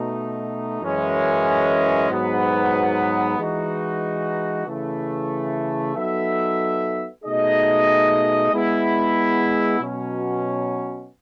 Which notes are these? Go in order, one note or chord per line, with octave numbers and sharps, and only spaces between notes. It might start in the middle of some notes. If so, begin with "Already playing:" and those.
Already playing: B2 A3 D#4
F#2 E3 G#3 C#4
G#2 F#3 B3
E3 G#3 D#4 F#4
C#3 E3 A3
F#3 B3 D#4 A4 E5
B2 A3 D#4 G#4 D#5
G#3 B3 E4
B2 F#3 C#4